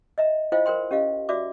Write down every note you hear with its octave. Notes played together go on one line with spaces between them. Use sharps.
D#5 E5 A#5
E4 F4 C5 D#5 F5 G5
A#4 C5 G5 C6
C#4 G4 D#5 F5
F#4 D5 E5 D6